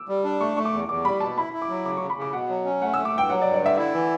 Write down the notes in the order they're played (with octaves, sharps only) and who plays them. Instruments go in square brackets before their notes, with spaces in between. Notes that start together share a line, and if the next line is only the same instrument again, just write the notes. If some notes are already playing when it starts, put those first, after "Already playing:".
Already playing: [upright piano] D6 E6
[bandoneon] G3
D4
[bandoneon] A3 [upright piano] C#6
[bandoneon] A3 [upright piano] C#6
[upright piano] D6
[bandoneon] E2
[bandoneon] E2 [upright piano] D6
[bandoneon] G3 [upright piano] B5
[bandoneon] B2 [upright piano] A5
[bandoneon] E4 [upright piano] B5
[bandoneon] E4
[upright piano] D6
[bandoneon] F#3
[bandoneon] C#3 [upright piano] D6
[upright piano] C#6
[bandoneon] C#3
[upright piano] B5
[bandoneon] C#3 [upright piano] D6
[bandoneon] B2 [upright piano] F#5
[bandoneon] F#3
C#4
[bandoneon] A3 [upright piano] F#5
[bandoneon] A3 [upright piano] E6
[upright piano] D6
[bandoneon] G2 [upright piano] G5
[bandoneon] F#3 [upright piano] F#5
[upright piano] D5
[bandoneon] G2
[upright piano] D5
[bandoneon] D3 [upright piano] E5
[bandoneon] E4 [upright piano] E5
[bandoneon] E3